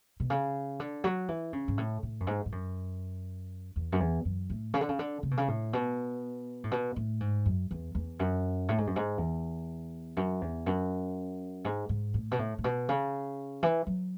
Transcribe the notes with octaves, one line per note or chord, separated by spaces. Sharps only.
B2
C#3
D3
F#3
E3
C#3
G#2
A2
A2
F#2
G#2
G#2
F#2
E2
F#2
E2
F#2
A2
C#3
D3
C#3
D3
C#3
B2
C#3
A2
B2
A2
B2
A2
G#2
F#2
E2
E2
F#2
A2
G#2
F#2
G#2
E2
F#2
E2
F#2
G#2
G#2
A2
B2
A2
A2
B2
C#3
E3
F#3